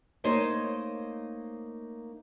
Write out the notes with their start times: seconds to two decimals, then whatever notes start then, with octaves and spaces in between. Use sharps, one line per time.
0.24 A3 A#3 D#4 C5 C#5 D#5